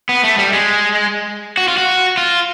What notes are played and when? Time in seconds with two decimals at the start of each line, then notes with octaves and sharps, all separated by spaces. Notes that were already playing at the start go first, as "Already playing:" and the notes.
0.09 B3
0.23 A3
0.38 G3
0.53 G#3
1.58 F#4
1.68 F4
1.78 F#4
2.17 F4